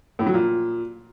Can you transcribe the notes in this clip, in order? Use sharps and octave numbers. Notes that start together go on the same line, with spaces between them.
A2
F#3
A#2